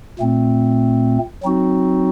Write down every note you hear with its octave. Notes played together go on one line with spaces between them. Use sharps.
A#2 A3 C4
F#3 C4 D#4 F#4